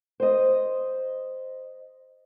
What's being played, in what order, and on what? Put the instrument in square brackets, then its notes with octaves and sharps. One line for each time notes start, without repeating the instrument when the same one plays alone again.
[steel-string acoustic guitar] C5 D#5